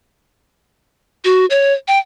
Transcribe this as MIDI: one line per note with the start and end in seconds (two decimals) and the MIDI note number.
1.25 1.46 66
1.50 1.73 73
1.88 1.99 79